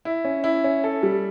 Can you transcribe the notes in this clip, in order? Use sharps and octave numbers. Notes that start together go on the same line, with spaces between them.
E4
C#4
E4
C#4
A4
G3